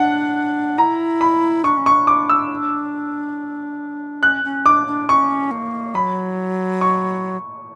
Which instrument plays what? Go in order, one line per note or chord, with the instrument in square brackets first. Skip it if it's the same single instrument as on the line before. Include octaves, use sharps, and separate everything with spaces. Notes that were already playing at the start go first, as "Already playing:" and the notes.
Already playing: [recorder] D4 [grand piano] F#5
[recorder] E4 [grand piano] A#5
[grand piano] B5
[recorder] D4 [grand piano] C#6
[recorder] C#4
[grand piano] C#6
[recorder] D4
[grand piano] D6
E6
[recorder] C#4 [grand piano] F#6
[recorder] C#4
[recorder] D4 [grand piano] D6
[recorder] D4
[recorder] C#4 [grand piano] C#6
[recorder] A#3
[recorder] F#3 [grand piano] B5
[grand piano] C#6